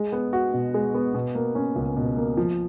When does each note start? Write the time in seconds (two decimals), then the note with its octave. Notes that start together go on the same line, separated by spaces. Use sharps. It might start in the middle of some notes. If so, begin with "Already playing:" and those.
Already playing: G#3
0.12 B3
0.33 F#4
0.54 B2
0.74 G#3
0.94 B3
1.15 B2
1.35 A#3
1.55 C#4
1.76 C#2
1.97 B2
2.17 A#3
2.37 F3